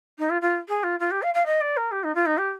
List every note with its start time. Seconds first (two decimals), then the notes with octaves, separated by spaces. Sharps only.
0.18 D#4
0.30 F4
0.41 F4
0.68 G#4
0.83 F4
0.99 F4
1.11 G4
1.22 F5
1.34 F5
1.46 D#5
1.61 D5
1.77 A#4
1.91 G4
2.04 D#4
2.15 F4
2.26 D#4
2.37 G4